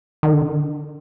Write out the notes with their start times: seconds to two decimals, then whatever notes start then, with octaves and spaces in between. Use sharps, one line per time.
0.23 D#3
0.33 D3